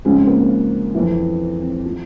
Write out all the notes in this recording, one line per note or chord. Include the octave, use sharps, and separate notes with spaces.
G#2 C#3 F3 C#4
C4
A#3
C4
F2 E3
C4
F3